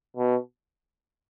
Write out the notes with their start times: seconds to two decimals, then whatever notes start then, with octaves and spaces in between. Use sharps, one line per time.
0.17 B2